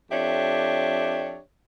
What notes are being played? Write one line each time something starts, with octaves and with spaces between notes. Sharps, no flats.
F2 D4 G4 C#5 E5